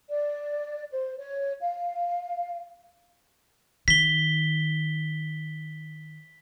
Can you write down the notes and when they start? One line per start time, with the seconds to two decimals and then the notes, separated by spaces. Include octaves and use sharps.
0.09 D5
0.91 C5
1.18 C#5
1.62 F5
3.88 D#3 B6 G7